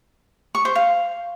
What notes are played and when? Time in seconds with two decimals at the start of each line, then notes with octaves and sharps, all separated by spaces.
0.55 C#6
0.65 C5
0.75 F5